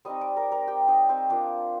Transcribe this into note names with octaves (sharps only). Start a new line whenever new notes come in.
G3 C4 D#4 D#5 D#6
D5 D6
A#4 A#5
A#4 A#5
G4 G5
D#4 D#5
C4 C5
F3 A#3 D4 F4 D5